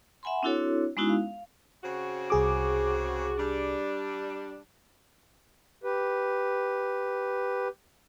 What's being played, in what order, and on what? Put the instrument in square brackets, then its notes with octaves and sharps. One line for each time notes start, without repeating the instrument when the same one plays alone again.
[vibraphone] E5 F#5 G#5 B5 C6
C4 D4 E4 F#4 A4 C#5
G#3 B3 C#4 D#4 E4 F#4
F5
[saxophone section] C#3 C4 F#4
[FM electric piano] C2 G#4 D6
[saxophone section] G3 D4
[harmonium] G4 B4